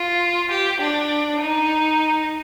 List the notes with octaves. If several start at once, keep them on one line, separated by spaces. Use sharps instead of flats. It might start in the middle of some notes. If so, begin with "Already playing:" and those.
Already playing: F4
G4
D4
D#4